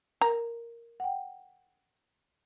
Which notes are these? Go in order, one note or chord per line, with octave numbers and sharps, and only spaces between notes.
A#4 A#5
F#5 G5